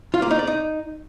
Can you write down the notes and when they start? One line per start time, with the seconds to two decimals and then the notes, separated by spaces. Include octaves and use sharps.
0.14 F4
0.22 A#3
0.31 D#4
0.39 D5
0.47 D#4